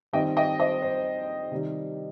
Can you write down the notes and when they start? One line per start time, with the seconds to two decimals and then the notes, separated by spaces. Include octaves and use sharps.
0.13 D#3 G3 C4 D#5 G5
0.37 D#5 G5
0.59 C5 D#5
0.82 C5
1.52 C3 D#3 G3